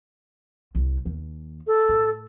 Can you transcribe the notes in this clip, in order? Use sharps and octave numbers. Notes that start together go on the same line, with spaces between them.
C2
D#2
A4
A2